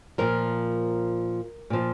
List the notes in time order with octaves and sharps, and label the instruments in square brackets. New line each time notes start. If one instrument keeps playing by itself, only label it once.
[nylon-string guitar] A#2 F3 A#4
A#2 F3